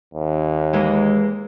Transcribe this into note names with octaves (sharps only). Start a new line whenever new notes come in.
D#2
E3 G#3 A#3